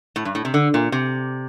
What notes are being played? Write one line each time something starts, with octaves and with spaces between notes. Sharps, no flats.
A2
G2
A2
C3
D3
A#2
C3